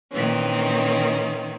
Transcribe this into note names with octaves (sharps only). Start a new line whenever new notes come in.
A#2 D#3 E3 C4 C#4